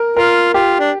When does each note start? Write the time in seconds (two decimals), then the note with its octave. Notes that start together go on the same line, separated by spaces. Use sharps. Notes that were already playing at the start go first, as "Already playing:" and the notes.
Already playing: A#4
0.17 F4 A#4
0.54 F4 G4
0.80 D4